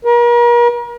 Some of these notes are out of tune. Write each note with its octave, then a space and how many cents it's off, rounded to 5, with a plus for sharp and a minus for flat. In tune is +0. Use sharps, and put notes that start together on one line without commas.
A#4 +40